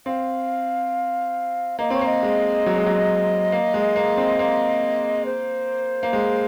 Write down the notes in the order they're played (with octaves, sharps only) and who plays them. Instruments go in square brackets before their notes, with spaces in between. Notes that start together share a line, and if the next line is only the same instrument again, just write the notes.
[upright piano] C4 [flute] F5
[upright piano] A#3 [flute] D#5
[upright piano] C4 [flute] C#5
[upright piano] A#3 [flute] D#5
[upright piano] G#3
F#3
G#3
F#3
A#3
G#3
A#3
C4
A#3
[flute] C5
[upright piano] A#3
G#3